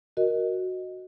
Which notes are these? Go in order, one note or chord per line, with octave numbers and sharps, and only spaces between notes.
F#4 A#4 D#5